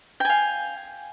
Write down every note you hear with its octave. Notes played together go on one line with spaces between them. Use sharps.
F5 G5 G#5